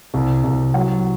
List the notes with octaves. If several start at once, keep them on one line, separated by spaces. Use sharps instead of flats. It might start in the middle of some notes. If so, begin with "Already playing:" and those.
C2
C2
F#3